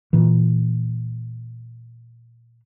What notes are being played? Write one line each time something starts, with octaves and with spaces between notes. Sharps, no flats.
A#2 E3